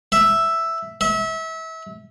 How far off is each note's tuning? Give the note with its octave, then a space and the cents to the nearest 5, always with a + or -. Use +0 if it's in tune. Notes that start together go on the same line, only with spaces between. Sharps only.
E5 +0
E5 -30